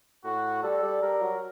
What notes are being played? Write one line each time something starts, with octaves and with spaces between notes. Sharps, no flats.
A2 F#4
G3 A4
G3
G3 A#4
F#3